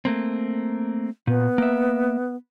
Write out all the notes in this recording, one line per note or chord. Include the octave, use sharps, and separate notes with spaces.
A3 A#3 C4
A#2 B3
A#3 E5